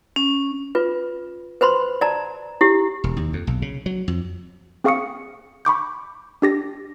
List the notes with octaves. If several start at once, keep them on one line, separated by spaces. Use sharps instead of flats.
C#4
F4 B4
B4 C5 B5 C6
D5 A5 A#5
E4 G4
E1
D#2
F2
B1
C#3
F#3
F2
C4 G#4 F5 C#6 D#6 C#7
B5 C#6 D6 G6
D4 G4 A#6